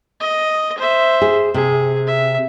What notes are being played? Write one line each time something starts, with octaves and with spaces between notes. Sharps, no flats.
D#5
C5 E5
G#4
C3 G#4
E5